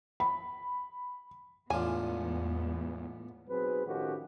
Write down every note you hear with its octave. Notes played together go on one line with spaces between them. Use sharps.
B5
E2 A2 G#3 B3 D4 F4 G#5
B1 F#3 C4 G#4 B4
A2 D#3 F3 C#4 F#4 G4